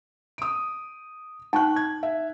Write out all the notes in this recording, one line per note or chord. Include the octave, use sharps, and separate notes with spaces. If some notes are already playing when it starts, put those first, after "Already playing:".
D#6 D7
D#4 G5 C#6 F#6
G#6
E5